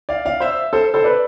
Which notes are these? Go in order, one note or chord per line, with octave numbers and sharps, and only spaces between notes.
D5 F5
D5 F5
C5 E5
A4 C5
A4 C5
B4 D5